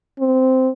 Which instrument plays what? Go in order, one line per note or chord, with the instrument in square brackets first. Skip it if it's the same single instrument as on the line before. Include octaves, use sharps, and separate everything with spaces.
[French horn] C4